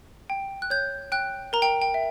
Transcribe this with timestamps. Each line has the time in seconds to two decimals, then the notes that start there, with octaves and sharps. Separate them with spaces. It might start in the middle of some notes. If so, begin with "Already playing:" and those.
0.30 G5
0.62 F#6
0.70 C#5 G6
1.12 G5 F#6
1.53 A#4 A#5
1.62 G5
1.82 G5
1.94 E5